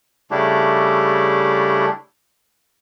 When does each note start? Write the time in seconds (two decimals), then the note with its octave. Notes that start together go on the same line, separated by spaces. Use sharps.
0.31 C#3 G3 A3 D4 E4 G4